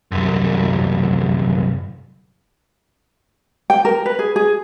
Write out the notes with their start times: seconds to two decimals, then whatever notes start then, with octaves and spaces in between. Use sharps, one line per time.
0.12 C2 F#2
3.70 G5
3.85 A#4
4.06 B4
4.19 G#4
4.36 G#4